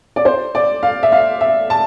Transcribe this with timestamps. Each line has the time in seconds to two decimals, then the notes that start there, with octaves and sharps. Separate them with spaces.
0.16 D5
0.25 C5
0.55 D5
0.83 F5
1.03 E5
1.12 F5
1.41 E5
1.70 A5